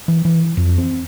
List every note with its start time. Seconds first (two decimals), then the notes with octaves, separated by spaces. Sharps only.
0.08 E3
0.25 E3
0.57 F2
0.78 C4